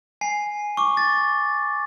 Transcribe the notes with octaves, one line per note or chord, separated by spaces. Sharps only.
G#5 C7
C#6 D6
A6